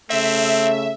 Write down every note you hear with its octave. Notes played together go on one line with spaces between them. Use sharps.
C#3 A3 C4 E5